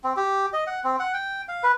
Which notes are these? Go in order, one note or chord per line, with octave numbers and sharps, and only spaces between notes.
C4
G4
D#5
F#5
C4
F#5
G5
F5
B4